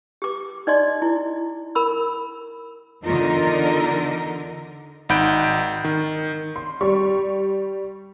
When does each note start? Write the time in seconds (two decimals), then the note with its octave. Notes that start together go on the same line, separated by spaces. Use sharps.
0.22 G4 D6
0.67 D#4 D5 D#5 C6
1.02 E4
1.75 A#4 B5 E6
3.05 E2 D3 D#4 F4 A#4
5.09 G#1 D#4 F#5 B5 G6 D7
5.84 D#3
6.56 C6
6.81 G3 C#6